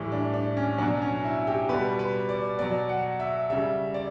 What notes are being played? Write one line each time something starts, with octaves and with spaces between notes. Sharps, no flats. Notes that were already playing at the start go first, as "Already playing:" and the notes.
Already playing: A2 E3 G3
D4
D4
C#4
B2 F#3 D4
C#4
E4
G4
B2 G3 B4
B4
D5
B2 F#3 D5
F#5
E5
C#3 G3 E5
D5